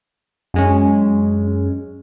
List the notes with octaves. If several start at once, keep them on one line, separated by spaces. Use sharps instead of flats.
F#2 G#3 C#4